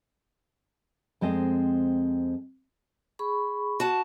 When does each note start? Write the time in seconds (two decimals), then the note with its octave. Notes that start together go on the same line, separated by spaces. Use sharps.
1.21 F2 G#3 C4 D#5
3.19 G#4 B5 C#6
3.80 F#4 A5